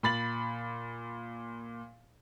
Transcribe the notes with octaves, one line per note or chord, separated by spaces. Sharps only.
A#2 B5 A6 F#7